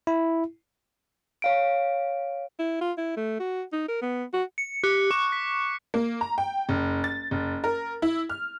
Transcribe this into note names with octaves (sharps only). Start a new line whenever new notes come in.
E4
C#5 F5 D7
E4
F4
E4
A3
F#4
D#4
A#4
B3
F#4
C#7
G4 F#6 C#7
C#6 D6
B6
A#3
A#5
G5
F#1
A6
F#1
A#4
E4
F6